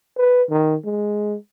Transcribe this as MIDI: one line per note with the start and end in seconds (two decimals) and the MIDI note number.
0.17 0.43 71
0.50 0.75 51
0.85 1.36 56